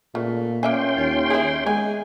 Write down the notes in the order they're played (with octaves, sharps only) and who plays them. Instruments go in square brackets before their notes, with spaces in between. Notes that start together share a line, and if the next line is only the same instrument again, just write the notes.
[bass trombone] A#2 [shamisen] C#3 [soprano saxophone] A3
[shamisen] A#3 E5 G#5 [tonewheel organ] C#4 G5 C6
[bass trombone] D#2 [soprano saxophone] F4
[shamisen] E4 E5 [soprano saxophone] G#4
[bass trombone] G#3 [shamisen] B3 G4 [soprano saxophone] G#5